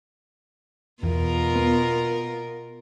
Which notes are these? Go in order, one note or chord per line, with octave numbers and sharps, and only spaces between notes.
E2 B2 F4 A#4
B3